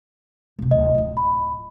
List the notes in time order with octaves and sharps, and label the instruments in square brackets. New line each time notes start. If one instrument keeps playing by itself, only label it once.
[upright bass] E1 C3
[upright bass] D1 C2 [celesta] D#5
[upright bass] D1 F4
[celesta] B5